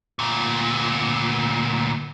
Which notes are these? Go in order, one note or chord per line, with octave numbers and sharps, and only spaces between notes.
D2 A#2